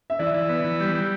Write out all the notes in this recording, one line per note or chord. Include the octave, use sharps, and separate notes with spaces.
E5
E3 D5
E3
B3
E3
G3
G3